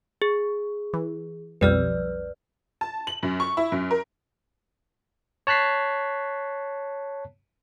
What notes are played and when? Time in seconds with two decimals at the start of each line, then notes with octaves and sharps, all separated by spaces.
0.22 G#4
0.93 E3
1.61 B1 F2 G3 B4 D5 F6
2.81 A5
3.07 F#7
3.23 F#2
3.40 C#6
3.57 E4
3.72 F#2
3.91 A#4
5.47 C#5 A5 F#6 B6 C7